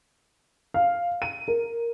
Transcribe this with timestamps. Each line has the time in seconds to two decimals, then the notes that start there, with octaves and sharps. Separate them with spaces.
0.74 F5
1.22 D#7
1.48 A#4